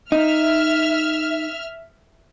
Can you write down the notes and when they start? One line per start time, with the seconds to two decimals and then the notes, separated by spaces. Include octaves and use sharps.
0.12 D#4 E5 F6